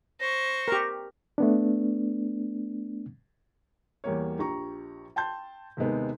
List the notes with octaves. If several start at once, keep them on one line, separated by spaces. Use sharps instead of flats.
C5 C#6 A#6
G4 A#4
A3 B3 D4
E2 G3 A#3 C#5
A#1 G4 A#5 C#6
G5 A5 C6 G6
D#2 C3 D#3 G#3 B3